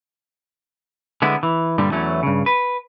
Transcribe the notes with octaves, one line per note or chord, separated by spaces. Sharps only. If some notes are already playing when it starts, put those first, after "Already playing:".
D3 G#3 B3 E4
E3
G2 A#2 D3 G3
E2 E3 F#3 A3 C#4
G2 C#3
B4